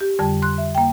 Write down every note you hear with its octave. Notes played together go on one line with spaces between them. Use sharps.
G4
F2 D3 G3 A5
C6 F#6
E5
A#3 G5